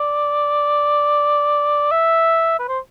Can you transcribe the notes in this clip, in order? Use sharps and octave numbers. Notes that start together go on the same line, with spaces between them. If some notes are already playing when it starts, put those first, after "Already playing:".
Already playing: D5
E5
B4
C5